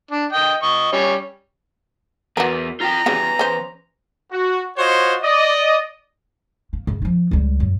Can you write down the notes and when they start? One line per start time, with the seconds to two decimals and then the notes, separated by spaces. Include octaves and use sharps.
0.11 D4
0.33 D#5 G5
0.63 D#5 C#6
0.92 G3 C#4
2.37 E2 F#4 A#4 B4
2.81 F4 G5 A#5
3.06 C#3 E3 F#3 G3 B3
3.39 C#4 C5
4.31 F#4
4.77 F4 F#4 C5 C#5 D#5
5.22 D5 D#5
6.73 A#3
6.87 F#2 C#3
7.02 F3 D#4
7.31 C#2 G3
7.60 F#2